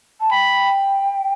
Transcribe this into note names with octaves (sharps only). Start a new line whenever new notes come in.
A5
G5 B5